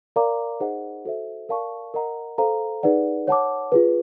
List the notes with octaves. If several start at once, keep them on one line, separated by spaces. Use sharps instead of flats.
A#4 D5 F5 A#5 D6
D#4 G#4 C5 D#5 F#5
F#4 A4 C5 E5
A#4 D5 F5 A5 C#6
A#4 D#5 F#5 A#5
A4 C5 F5 A#5
D#4 G#4 B4 D5 F#5
C#5 F#5 A5 D6
F4 G#4 B4